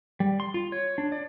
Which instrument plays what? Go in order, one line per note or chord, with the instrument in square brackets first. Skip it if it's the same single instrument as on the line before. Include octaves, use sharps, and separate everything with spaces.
[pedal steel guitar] G3
C6
F4
C#5
D4
D5